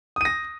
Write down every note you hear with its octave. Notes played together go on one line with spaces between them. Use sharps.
D#6 A#6 D#7